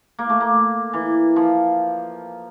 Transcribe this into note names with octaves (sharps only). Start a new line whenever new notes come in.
A#3
A3
A#3
E3
F3